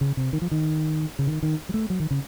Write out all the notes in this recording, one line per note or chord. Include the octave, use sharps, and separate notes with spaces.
C#3
C3
D#3
F3
D#3
C#3
D#3
D#3
F#3
A3
F#3
D#3
C#3